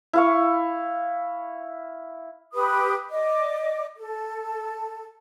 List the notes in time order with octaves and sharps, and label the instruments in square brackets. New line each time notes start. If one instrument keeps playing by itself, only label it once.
[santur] E4 F5 C#6
[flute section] G4 B4 B5 D#6
D5 D#5 D6
A4